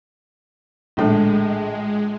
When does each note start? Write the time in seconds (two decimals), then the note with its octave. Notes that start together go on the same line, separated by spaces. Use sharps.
0.97 A#1 A2 D3 G#3